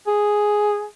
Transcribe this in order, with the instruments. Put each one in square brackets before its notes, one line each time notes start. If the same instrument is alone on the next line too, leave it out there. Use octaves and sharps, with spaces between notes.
[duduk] G#4